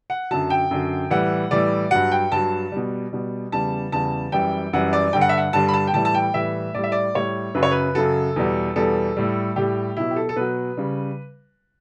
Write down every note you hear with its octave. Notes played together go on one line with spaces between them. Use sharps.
F#5
F#2 D3 F#3 A5
G5
F#2 D3 F#3
A2 E3 G3 F#5
A2 E3 G3 D5
G2 F#3 F#5
G5
G2 F#3 A5
B2 G3
B2 G3
E2 C#3 G3 A5
E2 C#3 G3 A5
F#2 E3 G3 G5
F#2 E3 G3 F#5
D5
G2 D3 G3 G5
F#5
E5
F#5
G2 D3 G3 A5
B5
A5
G5
A2 E3 G3 A5
A5
G5
A2 E3 G3 E5
A2 G3 D5
E5
D5
A2 G3 C#5
F#2 C#3 F#3 B4
C#5
B4
F#2 C#3 F#3 A4
E2 B2 G3
E2 B2 G3 A4
A2 G3
A2 G3 G4
B2 F#3 E4
G4
A4
A4
B2 F#3 B4
C#3 G3